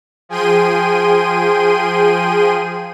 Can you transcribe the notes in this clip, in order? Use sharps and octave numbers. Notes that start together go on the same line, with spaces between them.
F3 G#4 G5 C6 D#7